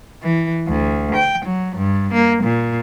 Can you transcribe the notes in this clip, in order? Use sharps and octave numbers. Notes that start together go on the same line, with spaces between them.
E3
D2
G5
F#3
G2
A#3
A#2